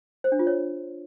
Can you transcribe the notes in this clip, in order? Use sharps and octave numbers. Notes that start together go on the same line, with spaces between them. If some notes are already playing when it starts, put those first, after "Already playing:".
C5
D4
F4
C#5